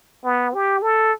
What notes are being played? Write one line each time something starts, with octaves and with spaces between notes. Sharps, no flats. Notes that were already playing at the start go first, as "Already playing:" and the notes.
B3
G4
A4